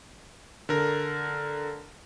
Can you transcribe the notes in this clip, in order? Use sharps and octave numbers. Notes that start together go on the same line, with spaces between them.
D3 A#4